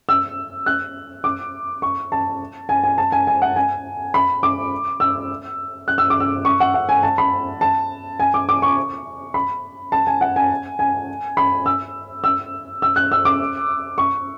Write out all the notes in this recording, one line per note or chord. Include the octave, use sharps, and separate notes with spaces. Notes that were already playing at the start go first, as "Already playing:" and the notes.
E6
F#6
D6
C#6
A5
G#5
G#5
A5
G#5
G#5
F#5
G#5
B5
D6
E6
F#6
E6
D6
E6
C#6
F#5
F#5
G#5
A5
B5
A5
G#5
D6
D6
C#6
B5
A5
G#5
F#5
G#5
G#5
B5
E6
E6
E6
F#6
E6
D6
C#6